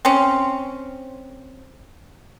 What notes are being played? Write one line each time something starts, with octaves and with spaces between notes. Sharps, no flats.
C4 C#4